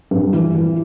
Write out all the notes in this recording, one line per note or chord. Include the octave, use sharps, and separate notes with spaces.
G2
E3
E3